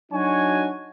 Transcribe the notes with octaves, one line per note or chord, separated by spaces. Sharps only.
F#3 D4 D#4 F#4 C#5 G#5